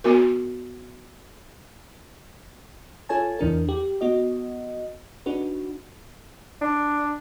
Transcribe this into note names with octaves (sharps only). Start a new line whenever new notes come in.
B3 F#4 A#4
F4 A4 C#5 G#5 A5
E2 E3 D4 A#4
G4
B3 F#4 D#5
D4 D#4 F#4 B4
D4